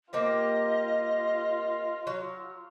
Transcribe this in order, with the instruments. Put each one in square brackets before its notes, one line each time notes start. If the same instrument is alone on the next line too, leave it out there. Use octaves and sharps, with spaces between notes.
[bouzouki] A#3 C4 G4 [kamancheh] F4 [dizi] D#5
[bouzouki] F#3